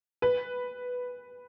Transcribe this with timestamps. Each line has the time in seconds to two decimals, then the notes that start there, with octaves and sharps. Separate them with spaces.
0.22 B4